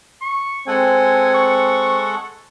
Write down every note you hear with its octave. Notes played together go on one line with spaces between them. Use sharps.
C#6
G#3 C4 A4 F#5 G#5
C#6